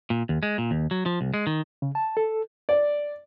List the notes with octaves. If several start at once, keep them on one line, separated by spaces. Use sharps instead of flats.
A#2
D#2
G#3
A#2
D#2
F#3
F3
C2
G#3
D#3
C#3
A5
A4
D5